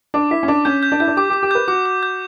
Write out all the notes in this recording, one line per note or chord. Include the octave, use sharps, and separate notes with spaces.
D4 D6
E4 B6
C#4
D4 D6
C#4 G6
G6
D4
E4 G6
D4
G4 D6
G4 D6
G4
B4 G6
F#4 D6
D6
G6